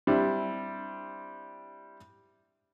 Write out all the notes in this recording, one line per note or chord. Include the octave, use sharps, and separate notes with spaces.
G3 C4 D4 E4